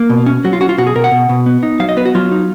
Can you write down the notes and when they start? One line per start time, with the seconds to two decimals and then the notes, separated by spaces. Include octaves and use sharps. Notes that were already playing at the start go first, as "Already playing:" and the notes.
Already playing: A#3
0.10 B2
0.26 C#4
0.44 F#3 F#4
0.53 F4
0.61 C#4 F#4
0.69 F4
0.78 B2 F#4
0.87 G#4
0.96 B2 A#4
1.04 F#5
1.12 B2
1.29 B2
1.46 B3
1.63 D#4
1.80 F#3 F5
1.89 D#5
1.97 B3 B4
2.05 F#4
2.15 F#3 F4
2.32 D#4